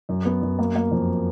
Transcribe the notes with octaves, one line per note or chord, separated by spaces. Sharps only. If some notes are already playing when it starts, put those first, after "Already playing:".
F#2
B3
F#2
A#3
A#3
F2